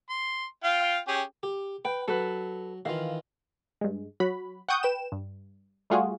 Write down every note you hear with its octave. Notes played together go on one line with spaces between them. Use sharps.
C6
F4 F5 G5
C#4 G4 G#4
G4
B4 G5
F#3 A4 B4
D#3 E3 F4 F5
G2 G#3
F#3 F#4 B5
F#5 G5 C#6 D#6 G6
B4 G5 E7
G2
G3 A3 F4 F#4 G#4